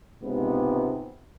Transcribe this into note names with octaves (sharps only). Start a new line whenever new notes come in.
C#2 G#2 C3 B3